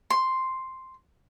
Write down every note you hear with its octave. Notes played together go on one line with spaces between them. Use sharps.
C6